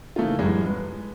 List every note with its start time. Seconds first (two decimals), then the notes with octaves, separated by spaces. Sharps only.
0.16 C#3 E3 A3 A#3 D#4 F4
0.39 F#2 A2 E3 G3 G#3
0.64 G#3 B4